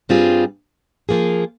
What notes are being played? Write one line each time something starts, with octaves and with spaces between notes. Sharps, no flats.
G2 G3 C4 F4 G#4
F3 A#3 F4 G#4